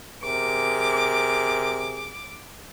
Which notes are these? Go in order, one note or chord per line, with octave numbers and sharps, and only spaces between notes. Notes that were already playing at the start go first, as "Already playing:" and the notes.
C3 G#4 A#4 D6